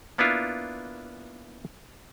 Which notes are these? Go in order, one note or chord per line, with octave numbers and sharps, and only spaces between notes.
A#3 B3 D4 E4 F4